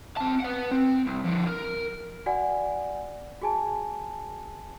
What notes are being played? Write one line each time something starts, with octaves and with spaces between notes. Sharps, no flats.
C4 A5
B4 F#5
C4
C2
D3 F3
A#4
F#4 D5 F#5 G#5
F#4 G#4 G#5 A5